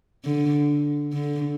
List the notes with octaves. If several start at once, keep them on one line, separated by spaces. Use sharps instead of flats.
D3
D3